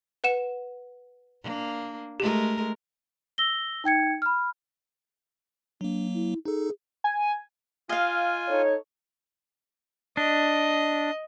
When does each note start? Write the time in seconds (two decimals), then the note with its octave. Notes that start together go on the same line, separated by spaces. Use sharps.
0.24 B4 F#5 E7
1.42 A#3 D4
2.20 G#3 A3 G4 A#4
3.38 E6 A#6 G7
3.84 D#4 G5 G#6 C#7
4.22 B5 F6
5.81 F#3 A#3 D4
6.14 E4
6.45 D#4 G#4 A4
7.04 G#5
7.89 F4 D#5 F5 G#5
8.48 D#4 A4 C#5
10.17 D4 D#5